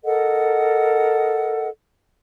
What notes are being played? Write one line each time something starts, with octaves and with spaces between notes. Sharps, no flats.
A4 A#4 D#5 F#5